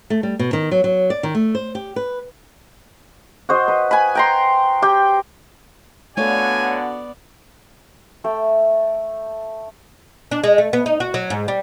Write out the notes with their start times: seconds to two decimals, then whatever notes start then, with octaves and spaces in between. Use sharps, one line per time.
0.10 A3
0.23 G3
0.39 B2
0.53 D#3
0.71 F#3
0.84 F#3
1.10 D5
1.23 D#3
1.35 A3
1.55 C5
1.75 G4
1.96 B4
3.49 F#4 C5 D#5
3.68 B4
3.91 G#5 B5
4.15 G5 A#5 C6
4.82 G4 G5
6.17 D3 A3 B3 F#4 C#5 D5 F5 G#5
8.24 A3 G5 E6
10.31 D4
10.44 G#3
10.58 A3
10.73 B3
10.86 D#4
11.00 F#4
11.14 F#3
11.30 G#2
11.48 G3